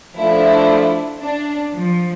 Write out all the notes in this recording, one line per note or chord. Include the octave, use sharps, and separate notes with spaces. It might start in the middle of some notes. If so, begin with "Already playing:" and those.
F3 A3 D4 E4
D4
F3